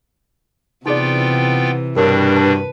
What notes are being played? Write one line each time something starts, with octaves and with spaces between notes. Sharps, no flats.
C3 E3 B3 D#4 F4 G#4 D5 G5
G2 B2 D4 A#4 C#5
B4 A5